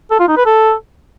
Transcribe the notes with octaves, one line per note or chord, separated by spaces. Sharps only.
A4
F4
D#4
B4
A4